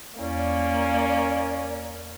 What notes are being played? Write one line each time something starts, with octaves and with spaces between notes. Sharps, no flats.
E2 A#3 C#4 D5